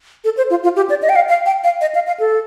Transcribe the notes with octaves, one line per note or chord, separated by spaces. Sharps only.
A4
C5
F4
F4
G4
D5
D#5
G5
F5
F5
G5
F5
D#5
F5
F5
A4